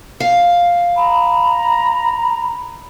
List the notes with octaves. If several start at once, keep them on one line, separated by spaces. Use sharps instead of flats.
F5
A#5 B5